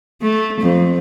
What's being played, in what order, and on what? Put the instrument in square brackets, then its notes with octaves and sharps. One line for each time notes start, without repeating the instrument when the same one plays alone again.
[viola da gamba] A3
F2